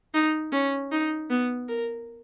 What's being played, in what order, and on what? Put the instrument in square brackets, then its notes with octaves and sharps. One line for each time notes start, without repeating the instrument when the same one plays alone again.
[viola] D#4
C#4
D#4
B3
A#4